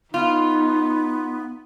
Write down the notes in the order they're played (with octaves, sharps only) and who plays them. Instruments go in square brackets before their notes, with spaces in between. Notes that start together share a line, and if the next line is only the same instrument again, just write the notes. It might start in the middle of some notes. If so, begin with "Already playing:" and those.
[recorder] B3 [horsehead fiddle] D#4 [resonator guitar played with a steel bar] F4